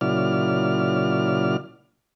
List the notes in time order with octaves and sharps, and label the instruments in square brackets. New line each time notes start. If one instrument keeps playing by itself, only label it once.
[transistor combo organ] A#2 C#3 F#3 E4 D5 F6